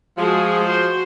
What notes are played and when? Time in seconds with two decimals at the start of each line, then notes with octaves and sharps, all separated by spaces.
0.18 F3 G#3 F#4 G#4
0.67 F#4 C5